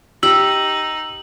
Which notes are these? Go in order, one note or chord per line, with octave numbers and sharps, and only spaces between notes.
D#4 G4 E6 F#7